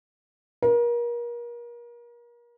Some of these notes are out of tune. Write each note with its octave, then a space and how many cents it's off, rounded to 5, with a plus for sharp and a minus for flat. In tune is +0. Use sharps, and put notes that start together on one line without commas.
A#4 +35